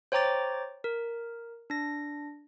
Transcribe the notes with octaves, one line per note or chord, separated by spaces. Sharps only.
C5 C#5 G5 A#5 D6 A6
A#4
D4 A#6